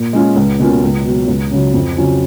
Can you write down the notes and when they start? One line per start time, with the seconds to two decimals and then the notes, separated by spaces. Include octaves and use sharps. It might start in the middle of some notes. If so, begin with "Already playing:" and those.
Already playing: A#2
0.13 G#3 C#4 F4
0.36 C#2
0.59 B2 A#3 C#4 F4
0.82 C#2
1.05 B2 F#3
1.27 C#2
1.51 C#3 F#3
1.74 F2
1.97 C#3 F#3 C#4 F4